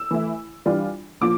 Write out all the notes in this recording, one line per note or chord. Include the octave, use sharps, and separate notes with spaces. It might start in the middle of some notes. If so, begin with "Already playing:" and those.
Already playing: E6
E3 A3 E4
E3 G3 D4 F4
A#2 F3 D6